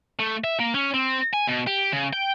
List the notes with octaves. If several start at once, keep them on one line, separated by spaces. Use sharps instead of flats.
A3
E5
A#3
C#4
C4
G#5
B2
G4
C#3
G5